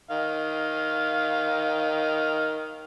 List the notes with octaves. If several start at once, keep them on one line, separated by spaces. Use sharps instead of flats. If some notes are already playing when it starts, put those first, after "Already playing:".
D#3 F5